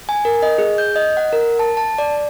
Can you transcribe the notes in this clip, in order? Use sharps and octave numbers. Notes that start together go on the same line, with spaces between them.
G#5
A#4
D#5
G#4
G6
D#5
F#5
A#4
A5
A5
D5